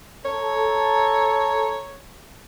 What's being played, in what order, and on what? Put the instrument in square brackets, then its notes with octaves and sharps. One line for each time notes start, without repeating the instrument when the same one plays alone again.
[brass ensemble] A4 A#5 [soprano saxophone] C#5